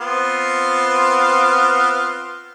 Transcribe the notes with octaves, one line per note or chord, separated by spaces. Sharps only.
B3 C4 F4